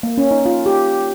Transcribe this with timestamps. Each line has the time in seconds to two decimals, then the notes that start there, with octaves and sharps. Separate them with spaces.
0.03 A#3
0.18 C#4
0.31 D#4
0.46 F4
0.66 G4